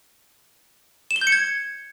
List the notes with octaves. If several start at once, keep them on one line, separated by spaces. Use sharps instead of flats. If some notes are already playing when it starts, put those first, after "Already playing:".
E7
G7
G6
C#7
G#6